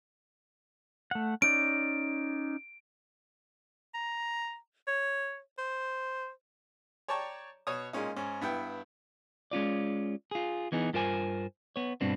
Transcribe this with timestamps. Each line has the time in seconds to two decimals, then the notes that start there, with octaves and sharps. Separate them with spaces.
1.11 A3 F#5
1.42 C#4 D#4 D5 D7
3.94 A#5
4.88 C#5
5.58 C5
7.08 C#5 D5 G5 A5 A#5 C#6
7.67 B2 C#5 D#6
7.93 A#2 G#3 C#4 D#4
8.16 G#2 C#4
8.41 G2 B3 E4 G5
9.51 G#3 C#4 F4 D5
10.31 F4 G#4
10.72 E3 B3 D#4 G#4
10.93 G2 F4 A#4 C5 G#5
11.76 B3 C#5
12.01 G2 B2 B3 C4 D4